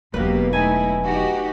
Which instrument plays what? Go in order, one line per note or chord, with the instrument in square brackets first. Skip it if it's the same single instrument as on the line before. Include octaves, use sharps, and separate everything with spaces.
[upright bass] E1 F#3 [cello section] B2 A#3 G4 [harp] B4
[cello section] A3 D#4 E4 [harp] G#5
[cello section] D#4 F#4 G4